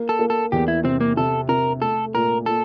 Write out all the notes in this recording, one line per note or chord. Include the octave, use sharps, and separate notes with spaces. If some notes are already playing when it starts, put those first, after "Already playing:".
Already playing: A#3
A4
A#3
A4
E2 G4
E4
C3 C4
A#3
C3 A4
C3 A#4
A3 A4
A#2 A#4
A#2 A4